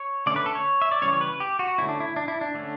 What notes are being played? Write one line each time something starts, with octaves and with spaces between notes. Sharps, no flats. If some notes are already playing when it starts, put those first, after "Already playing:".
Already playing: C#5
D3 A3 C#4 D5
B4
A4
C#5
E5
D5
C#3 E3 G3 C#4 C#5
C#5
B4
G4
F#4
D3 A3 C#4 E4
D4
E4
D4
E4
D4
D3 A3 C#4